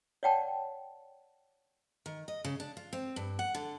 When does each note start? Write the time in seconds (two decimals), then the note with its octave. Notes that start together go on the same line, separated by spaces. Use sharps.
0.23 C#5 D5 F#5 G5 A5
2.06 D#3
2.28 D#5
2.44 C#3
2.60 D4
2.77 F4
2.93 C4
3.16 G2
3.39 F#5
3.55 D3